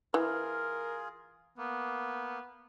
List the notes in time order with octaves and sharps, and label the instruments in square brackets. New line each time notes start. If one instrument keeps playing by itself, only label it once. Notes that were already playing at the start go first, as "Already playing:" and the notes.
[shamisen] E3 [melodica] F4 G#4 [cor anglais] A#4
[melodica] A#3 [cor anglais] B3